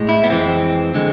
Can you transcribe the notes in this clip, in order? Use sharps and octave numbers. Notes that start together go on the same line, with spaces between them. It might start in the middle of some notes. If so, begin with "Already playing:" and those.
Already playing: A2 G#3
E4
B3
F2 E3 G#3 C4
D3 G#3